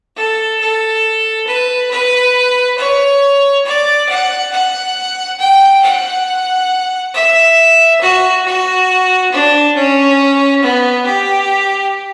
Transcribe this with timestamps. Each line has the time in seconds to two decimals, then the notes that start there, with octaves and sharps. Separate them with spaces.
0.16 A4
0.60 A4
1.47 B4
1.90 B4
2.78 C#5
3.65 D5
4.09 F#5
4.52 F#5
5.39 G5
5.82 F#5
7.14 E5
8.01 F#4
8.45 F#4
9.32 D4
9.75 C#4
10.62 B3
11.06 G4